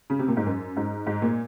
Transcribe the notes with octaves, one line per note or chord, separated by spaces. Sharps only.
C#3
C3
A#2
G#2
F#2
G#2
G#2
A#2